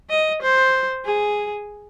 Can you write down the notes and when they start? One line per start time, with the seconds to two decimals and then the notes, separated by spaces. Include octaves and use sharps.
0.10 D#5
0.42 C5
1.06 G#4